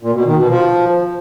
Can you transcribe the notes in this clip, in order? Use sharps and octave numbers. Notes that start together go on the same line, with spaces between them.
A#2
B2
D#3
B2
F3